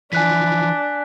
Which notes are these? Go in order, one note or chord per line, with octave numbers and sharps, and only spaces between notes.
E3 F3 D4 G#5 F#6 B6